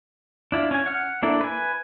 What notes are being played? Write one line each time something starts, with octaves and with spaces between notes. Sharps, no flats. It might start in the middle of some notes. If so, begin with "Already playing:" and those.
D4 E4 F4
C#4 G#5
F#5 F6
A#3 D4 E4 A4
B4 G#5